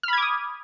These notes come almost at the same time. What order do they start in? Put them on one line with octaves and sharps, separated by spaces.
F6 B5 G#6 D6 D#6